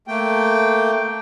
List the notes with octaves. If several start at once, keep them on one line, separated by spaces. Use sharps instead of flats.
A3 A#3 G5